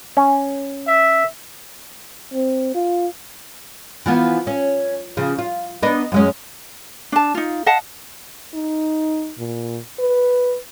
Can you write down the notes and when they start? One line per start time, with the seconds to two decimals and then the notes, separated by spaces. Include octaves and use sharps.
0.17 C#4
0.87 E5
2.34 C4
2.75 F4
4.06 E3 F3 B3
4.47 C#4
5.17 C#3 F3
5.38 F4
5.82 B3 D4 D#4
6.12 F#2 G#3 C#4
7.12 D4 A5
7.35 D#4 F4
7.66 D#5 F5 F#5 A5
8.54 D#4
9.39 A#2
9.99 B4